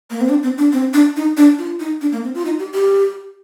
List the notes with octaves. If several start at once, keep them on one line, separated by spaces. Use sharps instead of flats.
A#3
C4
D4
C4
D4
C4
D4
D#4
D4
F4
D#4
D4
A#3
C4
F4
D#4
G4
G4